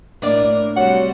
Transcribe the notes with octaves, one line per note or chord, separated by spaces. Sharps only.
A2 A#3 D4 A#4 D5
C3 F#3 G3 F#4 F#5